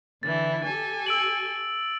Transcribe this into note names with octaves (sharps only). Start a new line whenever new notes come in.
D3 E3 E4 A6
G4 A4 G#5
E6 D7 F#7